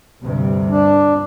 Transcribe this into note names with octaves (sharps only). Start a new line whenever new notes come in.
D2 G2 C3
D4